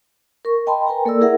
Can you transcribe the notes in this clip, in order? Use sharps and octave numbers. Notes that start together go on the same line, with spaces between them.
A#4 C#6
D#5 G5 A5 B5 C6
A#4 B4 G5 G#5 A#5
A#3 A4 A#4 D5 E6
E4 G#4 A#4 E5 F#5